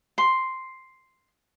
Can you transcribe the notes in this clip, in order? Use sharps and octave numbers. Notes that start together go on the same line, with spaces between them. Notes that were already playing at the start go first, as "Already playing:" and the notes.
C6